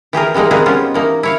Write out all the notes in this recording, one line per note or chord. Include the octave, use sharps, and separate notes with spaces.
E3 G4 G#4 A#4
E3 G3 G#3 A#3 D#4
G#3 A#3 C4 G#4 B4 C5
G3 B3 C#4 F4 C5
E3 A#3 D#4
E4 C#5 F5